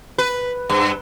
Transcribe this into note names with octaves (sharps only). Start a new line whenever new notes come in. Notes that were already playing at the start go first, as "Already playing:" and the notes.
B4
G2